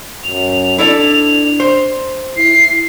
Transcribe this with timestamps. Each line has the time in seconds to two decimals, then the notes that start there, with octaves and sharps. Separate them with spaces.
0.24 F#2 F7
0.78 D4 E4 A4 D5
1.60 C5
2.37 E4 C7